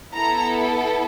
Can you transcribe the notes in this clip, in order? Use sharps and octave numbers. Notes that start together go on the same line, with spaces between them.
B3 E4 A4 A#5